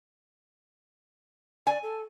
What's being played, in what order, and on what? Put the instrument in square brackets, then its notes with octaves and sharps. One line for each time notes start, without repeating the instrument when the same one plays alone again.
[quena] D5 [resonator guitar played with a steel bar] G#5
[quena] A4